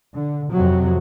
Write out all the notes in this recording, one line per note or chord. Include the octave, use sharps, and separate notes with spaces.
D3
F2 C3 F#3